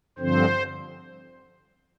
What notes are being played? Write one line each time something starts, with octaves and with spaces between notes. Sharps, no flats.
G2 D3 F3 C4 C5